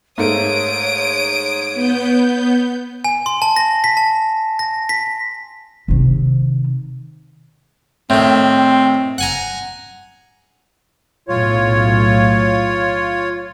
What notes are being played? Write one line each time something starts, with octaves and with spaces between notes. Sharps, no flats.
G#2 A3 A#3 C#5 D#6 D7
B3 G6
G#5
C6
A5
A#6
B6
A5
A#6
B6
C3 D#3
A2 D#3 C4
F#5 G#5 A#5
B1 A2 F4 C#5